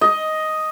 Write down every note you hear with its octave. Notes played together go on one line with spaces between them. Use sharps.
D#5